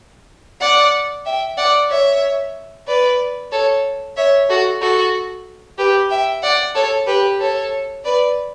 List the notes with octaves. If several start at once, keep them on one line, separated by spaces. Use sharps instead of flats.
D5 F#5
E5 G5
D5 F#5
C#5 E5
B4 D5
A4 C#5
C#5 E5
F#4 A4
F#4 A4
G4 B4
E5 G5
D5 F#5
A4 C#5
G4 B4
A4 C#5
B4 D5